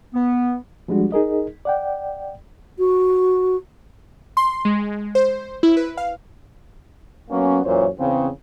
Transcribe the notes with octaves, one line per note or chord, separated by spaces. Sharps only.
B3
F3 G3 G#3 D4 F#4
D#4 G#4 A#4 D#5
D5 F#5 G5
F#4
C6
G#3
C5
E4
B4
F5
F#3 A#3 B3 C#4
F#2 A#2 E3 C#4 C5 C#5
E2 C#3 C4